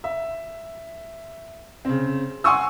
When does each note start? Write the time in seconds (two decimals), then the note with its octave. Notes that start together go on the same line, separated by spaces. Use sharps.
0.04 E5
1.85 C#3 C4
2.44 F#5 G#5 C6 C#6 D#6 E6